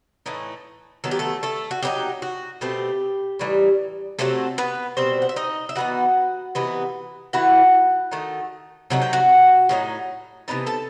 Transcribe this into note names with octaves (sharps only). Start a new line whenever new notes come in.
A2 E3 A3 D#4
D#3 F#3 B3 A4
G4
A3 A4
A3 A4
F#4
F#3 B3 D#4 G4
F#4
B2 A3 C4 G4
A2 E3 G3 D#4
C3 F#3 A3 C4 A4
B3 B4
B2 G3 C4 C5
F#5
E5
D#4 D#5
E5
E3 B3 D#4 F#4 F#5
C3 E3 B3 D#4
E3 A3 E4 F#4 F#5
D#3 A3 D#4
C3 F#3 A3 D#4 F#5
G5
F#4 F#5
A2 F#3 B3 D#4
C3 E3 B3 D#4 A5
A4 A5